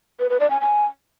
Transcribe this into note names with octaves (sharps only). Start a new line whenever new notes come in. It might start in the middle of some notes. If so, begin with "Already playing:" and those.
B4
B4
D5
G#5
G#5